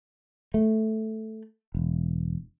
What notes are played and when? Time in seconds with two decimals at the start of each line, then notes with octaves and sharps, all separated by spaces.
0.54 A3
1.75 E1